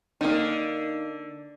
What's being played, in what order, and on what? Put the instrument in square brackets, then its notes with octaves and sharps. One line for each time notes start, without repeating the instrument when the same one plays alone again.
[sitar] D3 [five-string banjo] A#3 D#4